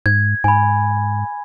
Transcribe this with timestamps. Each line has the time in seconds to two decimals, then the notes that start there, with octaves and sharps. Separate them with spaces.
0.06 G#2 G#6
0.44 G#2 G#5 B5